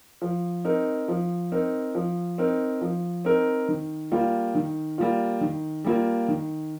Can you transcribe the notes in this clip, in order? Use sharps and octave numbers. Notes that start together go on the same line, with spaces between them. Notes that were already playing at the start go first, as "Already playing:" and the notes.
F3
C4 D#4 A#4
F3
C4 D#4 A#4
F3
C4 D#4 A#4
F3
C4 D#4 A#4
D#3
G3 A#3 F4
D#3
G3 A#3 F4
D#3
G3 A#3 F4
D#3